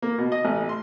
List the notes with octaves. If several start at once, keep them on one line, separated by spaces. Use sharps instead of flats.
A#3
B2
D#5
A1
C6